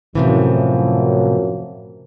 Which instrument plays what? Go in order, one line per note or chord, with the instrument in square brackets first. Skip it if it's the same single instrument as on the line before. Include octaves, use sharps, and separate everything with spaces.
[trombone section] F#2 F3 [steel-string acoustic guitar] A2 C3 E3